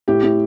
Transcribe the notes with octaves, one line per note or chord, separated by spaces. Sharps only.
A2 G4
A2